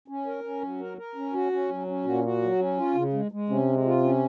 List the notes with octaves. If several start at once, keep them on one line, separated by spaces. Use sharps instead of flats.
C#4
A#4
C#4
F#3
A#4
A#4
C#4
F#4
C#4
F#3
C#4
A#2 F#4
F#4
F#3
C#4
F4
C#3
G#3
G#3
C3 C#4
G#3
F4
C#4